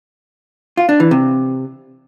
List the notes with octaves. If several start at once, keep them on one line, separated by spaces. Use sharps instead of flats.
F4
D4
E3
C3